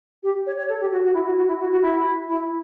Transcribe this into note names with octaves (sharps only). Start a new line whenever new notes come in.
G4
C#5
C#5
A4
G4
F#4
F#4
E4
F#4
F#4
E4
F#4
F#4
E4
E4